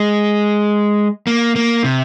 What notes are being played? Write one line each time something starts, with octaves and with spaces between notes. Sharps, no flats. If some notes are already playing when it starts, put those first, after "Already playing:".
Already playing: G#3
A#3
A#3
C3